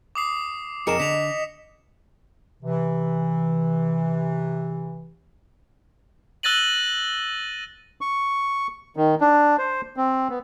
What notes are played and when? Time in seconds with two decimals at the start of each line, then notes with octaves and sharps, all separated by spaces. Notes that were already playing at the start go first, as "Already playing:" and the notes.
0.15 D6 D#6 C7
0.87 F2 G#4 A#4 D#5 C#7 E7
1.00 D3 B6 F7
2.63 C3 E3
6.43 E6 F#6 A6 A#6 D#7 F#7
8.01 C#6
8.96 D#3
9.21 D4
9.58 C5
9.97 C4
10.29 B3